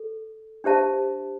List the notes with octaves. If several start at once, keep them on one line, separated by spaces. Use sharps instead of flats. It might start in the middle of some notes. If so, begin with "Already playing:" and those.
Already playing: A4
D4 G4 C5 E5 A5